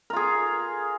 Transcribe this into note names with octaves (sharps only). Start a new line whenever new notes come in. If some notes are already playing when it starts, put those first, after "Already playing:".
F4 G#4 A#4